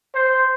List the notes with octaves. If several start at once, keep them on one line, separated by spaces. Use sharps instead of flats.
C5